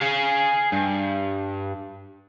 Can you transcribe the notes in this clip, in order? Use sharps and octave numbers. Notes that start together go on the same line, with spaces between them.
G#4 F5
G2